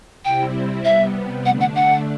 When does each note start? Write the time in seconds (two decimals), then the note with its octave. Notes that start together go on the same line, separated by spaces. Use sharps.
0.24 C3 G3 C4 E4 G5
0.85 C3 G3 B3 E5
1.45 D3 A3 D4 F#5
1.60 F#5
1.75 F#5